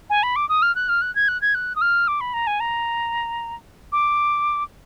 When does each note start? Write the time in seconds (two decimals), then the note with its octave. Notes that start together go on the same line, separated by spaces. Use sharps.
0.10 G#5
0.23 B5
0.36 D6
0.49 D#6
0.62 F6
0.76 F#6
0.89 F6
1.02 F#6
1.15 G#6
1.28 F#6
1.42 G#6
1.55 F#6
1.76 D#6
1.81 F6
2.08 D6
2.21 B5
2.34 A#5
2.47 G#5
2.60 A#5
3.92 D6